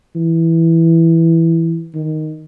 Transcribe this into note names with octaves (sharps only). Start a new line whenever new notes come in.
E3
D#3